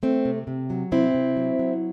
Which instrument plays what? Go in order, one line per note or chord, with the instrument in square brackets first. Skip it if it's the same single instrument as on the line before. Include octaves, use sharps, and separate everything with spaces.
[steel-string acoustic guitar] A3 C4
C3
C3
F#3
C3 C4 E4
C3
F#3
F#3